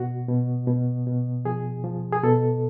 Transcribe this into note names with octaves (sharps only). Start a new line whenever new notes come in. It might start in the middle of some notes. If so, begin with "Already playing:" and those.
Already playing: B2 F#4
B2
B2
B2
F3 G#4
F3
G#4
B2 A4